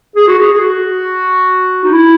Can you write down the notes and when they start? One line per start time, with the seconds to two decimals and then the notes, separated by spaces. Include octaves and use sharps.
0.16 G#4
0.28 F#4
0.38 G#4
0.53 G#4
0.60 F#4
1.84 D#4
1.92 E4